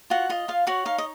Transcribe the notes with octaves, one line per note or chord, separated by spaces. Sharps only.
F4 F#4 F#5
F4 D#5
F4 F5
F#4 C#5 F#5
D#4 F5
D#5